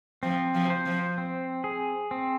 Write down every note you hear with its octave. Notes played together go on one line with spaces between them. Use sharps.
F3 C4
F3
C5
F3
C4
G#4
C4